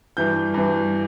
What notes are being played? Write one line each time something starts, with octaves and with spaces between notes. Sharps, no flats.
G2 E3 G6
G2 E3